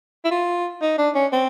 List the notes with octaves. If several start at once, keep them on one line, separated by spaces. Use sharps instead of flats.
E4
F4
D#4
D4
C#4
C4